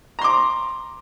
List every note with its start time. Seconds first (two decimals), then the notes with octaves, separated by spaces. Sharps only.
0.19 A#5
0.22 C6
0.24 D6